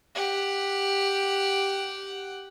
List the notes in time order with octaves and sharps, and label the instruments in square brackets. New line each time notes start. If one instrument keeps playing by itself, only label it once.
[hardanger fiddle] G4 F#5